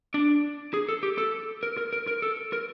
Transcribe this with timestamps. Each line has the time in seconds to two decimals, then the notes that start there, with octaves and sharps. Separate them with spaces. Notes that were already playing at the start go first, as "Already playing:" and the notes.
0.14 D4
0.74 G#4
0.89 A4
1.03 G4
1.18 A4
1.63 A#4
1.77 A#4
1.93 A#4
2.07 A#4
2.22 A4
2.53 A#4